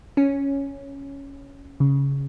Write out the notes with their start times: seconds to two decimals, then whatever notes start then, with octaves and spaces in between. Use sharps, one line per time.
0.17 C#4
1.80 C#3